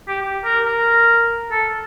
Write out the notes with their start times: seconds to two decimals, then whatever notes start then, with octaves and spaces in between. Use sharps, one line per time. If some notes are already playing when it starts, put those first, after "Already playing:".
0.08 G4
0.22 G4
0.44 A#4
0.66 A#4
1.51 A4